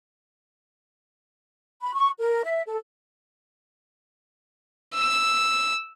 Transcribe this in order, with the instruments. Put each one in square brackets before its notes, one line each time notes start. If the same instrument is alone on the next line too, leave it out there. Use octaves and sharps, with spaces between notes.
[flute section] B5
C#6
A#4
E5
A4
[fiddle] E6